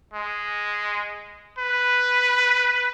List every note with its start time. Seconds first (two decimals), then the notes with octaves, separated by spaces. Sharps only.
0.14 G#3
1.59 B4